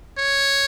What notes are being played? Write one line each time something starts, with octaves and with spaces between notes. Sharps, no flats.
C#5